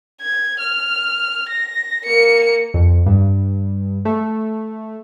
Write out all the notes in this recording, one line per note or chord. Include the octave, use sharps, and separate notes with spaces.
G#6
F6
A#6
A#3 C#7
F2
G2
A3